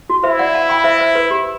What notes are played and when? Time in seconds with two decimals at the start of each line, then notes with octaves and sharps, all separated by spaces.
0.10 F#4
0.23 E4 C5 E5
0.39 D5 F#5
0.55 F#5 A5
0.69 G5 B5
0.84 C5 E5
1.00 C5
1.15 B4
1.31 G4